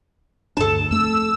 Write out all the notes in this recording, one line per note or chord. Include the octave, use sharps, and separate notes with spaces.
D2 G2 D4 A4 A5
F2 A3 E6